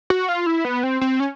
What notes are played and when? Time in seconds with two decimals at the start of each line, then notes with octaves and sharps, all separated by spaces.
0.10 F#4
0.29 F4
0.46 E4
0.65 B3
0.83 C4
1.01 C4
1.20 C#4